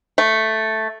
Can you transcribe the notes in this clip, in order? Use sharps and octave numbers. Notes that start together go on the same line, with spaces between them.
A3